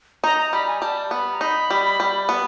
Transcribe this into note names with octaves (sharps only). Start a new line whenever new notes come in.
D#4 A#5
A#5
G3 B5
G#5
G3 A5
B3 B5
A#5
D#4 B5
G3
G3
B3